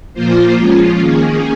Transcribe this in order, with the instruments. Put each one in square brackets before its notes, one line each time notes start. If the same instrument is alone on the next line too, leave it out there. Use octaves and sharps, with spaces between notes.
[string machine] A#2 F3 A#3 F4 C5
F3 G#3 C#4 F4
D#3 A#3 C#4 G#4